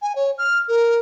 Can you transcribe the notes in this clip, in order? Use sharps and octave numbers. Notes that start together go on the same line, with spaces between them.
G#5
C#5
F6
A#4